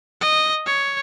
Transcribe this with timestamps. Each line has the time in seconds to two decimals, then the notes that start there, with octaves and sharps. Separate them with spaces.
0.21 D#5
0.66 C#5